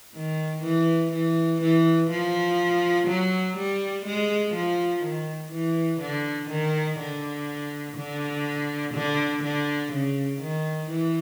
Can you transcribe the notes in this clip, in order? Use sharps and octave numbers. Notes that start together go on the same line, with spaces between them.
D#3
E3
E3
E3
F3
F#3
G3
G#3
F3
D#3
E3
D3
D#3
D3
D3
D3
D3
C#3
D#3
E3